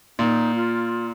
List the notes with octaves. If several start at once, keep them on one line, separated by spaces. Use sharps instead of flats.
A#2 D#4
F4